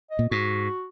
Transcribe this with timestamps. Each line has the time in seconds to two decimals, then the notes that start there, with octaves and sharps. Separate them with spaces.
0.11 D#5
0.19 A#2
0.31 G#2 F#4